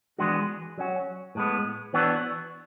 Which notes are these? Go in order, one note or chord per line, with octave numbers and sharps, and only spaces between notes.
E3 G#3 B3 D4 F#4
F#3 C#4 F#4
A2 G#3 B3
E3 B3 D4 F#4